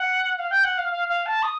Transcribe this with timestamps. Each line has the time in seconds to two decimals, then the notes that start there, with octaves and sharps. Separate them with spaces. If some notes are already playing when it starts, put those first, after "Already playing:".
Already playing: F#5
0.38 F5
0.51 G5
0.64 F#5
0.78 F5
0.91 F5
1.08 F5
1.26 A5
1.43 D#6